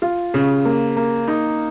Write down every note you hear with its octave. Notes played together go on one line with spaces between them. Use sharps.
F4
C#3
A#3
A#3
D#4